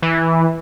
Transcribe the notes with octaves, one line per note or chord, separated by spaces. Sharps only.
E3